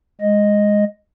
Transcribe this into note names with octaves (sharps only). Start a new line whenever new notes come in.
G#3 D#5